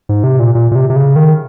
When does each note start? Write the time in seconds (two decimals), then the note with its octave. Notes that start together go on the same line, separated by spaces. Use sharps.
0.09 G#2
0.24 C3
0.39 A#2
0.55 A#2
0.71 A#2
0.75 C3
0.90 C3
0.96 C#3
1.16 D#3